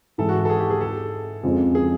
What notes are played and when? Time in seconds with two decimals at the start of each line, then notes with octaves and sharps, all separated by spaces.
0.18 G#2 E3 G#3 A4
0.29 F#4
0.40 F#4
0.45 A4
0.50 G#4
0.60 G4
0.70 G#4
0.81 A4
1.43 F2 C#3 F3 G#3
1.75 G#4